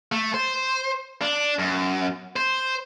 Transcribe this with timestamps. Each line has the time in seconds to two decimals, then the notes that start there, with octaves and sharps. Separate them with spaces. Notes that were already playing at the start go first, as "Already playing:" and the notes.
0.12 A3
0.34 C5
1.21 D4
1.59 F#2
2.36 C5